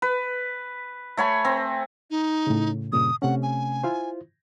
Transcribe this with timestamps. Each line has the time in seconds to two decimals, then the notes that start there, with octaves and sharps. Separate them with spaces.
0.02 B4
1.17 A3 C#5 G#5 B5
1.45 C4
2.11 D#4
2.47 A2 C#3
2.93 G2 A#2 C#3 D#6
3.22 C3 A3 C#4 F#5
3.43 G#5
3.84 E4 F4 C5